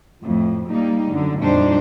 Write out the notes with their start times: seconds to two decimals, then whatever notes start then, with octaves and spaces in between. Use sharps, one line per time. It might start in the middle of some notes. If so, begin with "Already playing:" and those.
0.22 F2 A2
0.67 G3 A#3 D#4
1.11 F#2 D3
1.40 F2 A#2 G3 D4 D#4 C5